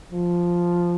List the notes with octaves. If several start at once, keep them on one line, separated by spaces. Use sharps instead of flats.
F3